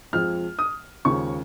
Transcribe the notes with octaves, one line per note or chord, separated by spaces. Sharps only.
F2 F3 G#3 F6
D#6
D#2 C#3 F3 G#3 C#6